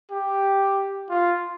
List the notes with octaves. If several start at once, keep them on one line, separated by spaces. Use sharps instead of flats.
G4
F4